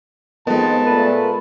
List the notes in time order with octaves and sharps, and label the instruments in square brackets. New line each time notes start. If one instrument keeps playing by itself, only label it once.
[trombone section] F2 [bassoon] D#3 [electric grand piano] G#3 B3 [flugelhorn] A5
[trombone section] A#2 A3 [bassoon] B4